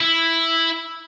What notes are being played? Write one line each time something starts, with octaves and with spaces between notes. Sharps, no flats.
E4